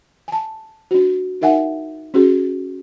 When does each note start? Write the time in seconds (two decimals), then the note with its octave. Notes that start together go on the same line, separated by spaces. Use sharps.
0.28 G#5 A5
0.91 D4 F#4
1.41 D#4 A#4 E5 F#5 G#5
2.14 C#4 F#4 G#4